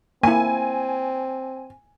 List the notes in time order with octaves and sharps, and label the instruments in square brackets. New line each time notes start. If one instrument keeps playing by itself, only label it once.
[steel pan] A#3 E4 [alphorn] C4 [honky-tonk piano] G#5